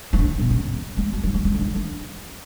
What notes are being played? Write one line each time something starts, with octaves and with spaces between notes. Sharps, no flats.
E3
D3
B2
C#3
G#3
F#3
F#3
G#3
G#3
D3
E3
D3